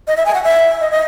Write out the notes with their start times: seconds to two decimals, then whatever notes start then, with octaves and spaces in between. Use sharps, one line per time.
0.08 D#5
0.17 E5
0.25 G#5
0.34 F#5
0.43 E5
0.81 D#5
0.91 D#5